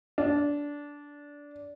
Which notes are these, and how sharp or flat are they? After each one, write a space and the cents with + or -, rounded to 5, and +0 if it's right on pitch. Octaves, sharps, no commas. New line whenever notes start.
D4 -15